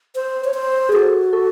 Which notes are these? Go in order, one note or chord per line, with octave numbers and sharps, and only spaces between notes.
C5
C#5
C5
G#4
F#4 A4
A4